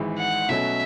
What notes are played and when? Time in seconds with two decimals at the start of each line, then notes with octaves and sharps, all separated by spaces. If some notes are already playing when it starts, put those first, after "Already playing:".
Already playing: G#1 G#2 E3 G#3
0.18 F#5
0.48 B2 F#3 A3 C#4 E5